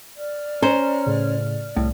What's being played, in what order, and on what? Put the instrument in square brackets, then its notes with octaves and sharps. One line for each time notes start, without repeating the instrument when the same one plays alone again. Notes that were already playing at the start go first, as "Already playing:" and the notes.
[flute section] D5 F6
[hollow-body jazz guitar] C#4 [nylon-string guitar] C5 [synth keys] A#5
[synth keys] A2 C#3
[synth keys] C2 [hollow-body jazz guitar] A2